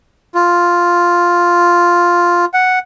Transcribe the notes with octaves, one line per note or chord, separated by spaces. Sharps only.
F4
F#5